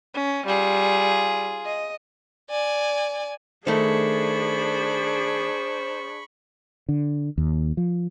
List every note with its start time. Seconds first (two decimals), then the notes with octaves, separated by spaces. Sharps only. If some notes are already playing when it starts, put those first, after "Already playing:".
0.14 C#4
0.46 G3 F4 G#4
1.65 D#5
2.50 D5 G#5
3.67 D#3 A3 D4 G#4 C5 B5 C#6
6.89 D3
7.38 D#2
7.77 F3